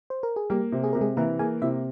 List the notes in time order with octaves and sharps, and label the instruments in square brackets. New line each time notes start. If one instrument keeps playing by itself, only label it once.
[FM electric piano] C5
A#4
G#4
[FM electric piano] G3 G4 [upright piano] A#3
[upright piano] C3
[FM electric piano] G#4
[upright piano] C3 [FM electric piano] A#4
[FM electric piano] G#3 G#4
[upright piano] E3 [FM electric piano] A#3 A#4
[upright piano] A#3 [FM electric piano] G#4 G#5
[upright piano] C3 [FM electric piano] E4 E5